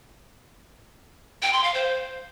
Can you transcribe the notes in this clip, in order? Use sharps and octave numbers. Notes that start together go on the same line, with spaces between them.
G5
C6
F5
C5